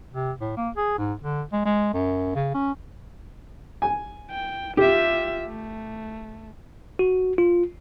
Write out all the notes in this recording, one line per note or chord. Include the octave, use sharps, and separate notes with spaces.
C3
A2
A#3
G#4
G#2
D3
G#3
G#3
F#2
C#3
C#4
G#5
G5
F4 G4 E5
A3
F#4
F4